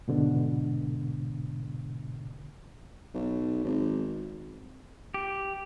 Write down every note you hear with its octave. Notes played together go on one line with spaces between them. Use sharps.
G#2 B2 D3
B1
G#1
G4